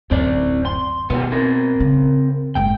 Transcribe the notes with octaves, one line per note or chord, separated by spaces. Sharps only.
D1 F#2 C4 D5
C6
B2 D#3 B3
C4 A#4
C#3
F#1 G#2 G5